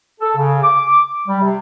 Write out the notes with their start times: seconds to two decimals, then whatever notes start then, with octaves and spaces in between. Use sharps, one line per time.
0.20 A4
0.36 C#3
0.63 D6
1.27 G3
1.40 C3